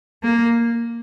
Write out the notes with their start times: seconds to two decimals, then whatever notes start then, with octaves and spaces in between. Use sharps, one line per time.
0.23 A#3